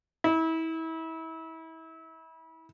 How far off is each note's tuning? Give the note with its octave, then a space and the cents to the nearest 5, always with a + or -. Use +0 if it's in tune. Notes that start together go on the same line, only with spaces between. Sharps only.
E4 -30